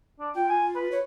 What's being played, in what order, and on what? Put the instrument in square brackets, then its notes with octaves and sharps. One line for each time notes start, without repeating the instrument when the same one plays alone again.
[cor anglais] D4
[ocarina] F4 [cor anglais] G5
[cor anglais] G#5
B4
[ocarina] C#5